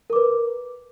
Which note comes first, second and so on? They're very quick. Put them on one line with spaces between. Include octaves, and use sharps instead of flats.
A#4 D6 B4